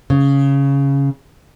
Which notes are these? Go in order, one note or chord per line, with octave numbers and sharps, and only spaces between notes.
C#3